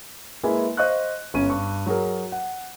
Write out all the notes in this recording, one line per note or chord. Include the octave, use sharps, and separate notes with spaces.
G#3 A#3 E4 A#4 B4 G#5
C5 D#5 F5 C#6 F#6
G1 C#4 D#7
G2 C#6
F#3 F#4 G#4 A#4
F#5